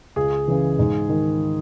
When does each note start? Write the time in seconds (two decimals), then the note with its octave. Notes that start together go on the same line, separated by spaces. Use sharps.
0.16 C#2 G#4
0.48 C#3 E3
0.79 G#2
1.09 D#3